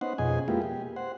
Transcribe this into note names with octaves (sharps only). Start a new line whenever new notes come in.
B3 C#4 D#4 C5 F#5
F2 B2 C#4 G#4 D#5 G#5
G#3 A#3 B3 E4 F4 G4
G4
C5 F#5